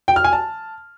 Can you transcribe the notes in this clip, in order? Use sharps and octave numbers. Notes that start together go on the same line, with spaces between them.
G5
F6
G#5
A5